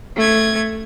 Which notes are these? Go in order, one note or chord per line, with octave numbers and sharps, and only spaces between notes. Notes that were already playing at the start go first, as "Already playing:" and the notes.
A3 G#6